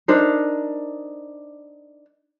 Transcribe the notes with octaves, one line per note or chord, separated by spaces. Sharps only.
D4 D#4 A#4 C5